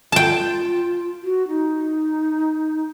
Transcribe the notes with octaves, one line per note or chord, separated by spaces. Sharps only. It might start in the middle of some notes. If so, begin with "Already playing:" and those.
F4 G5 A5
F#4
D#4